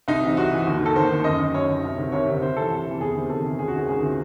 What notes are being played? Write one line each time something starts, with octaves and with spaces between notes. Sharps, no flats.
C2 D#4
C3 E3
C2 F#4
C3 E3
D#2
D#3
A4
D#2 C5
D#3
F#2 D#5
D#3
F#2 C#5
D#3
C2
C3 D#3
C2 C#5
C3 D#3
C2 C5
C3 E3 A4
C2
C3
E3
E2 G#4
C3 D#3
E2 A4
C3 D#3
C#2 G#4
F#4
C3 D#3 G#4
C#2 G#4
C3 D#3